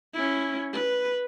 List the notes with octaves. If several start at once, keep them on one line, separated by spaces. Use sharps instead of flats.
C#4 E4
B4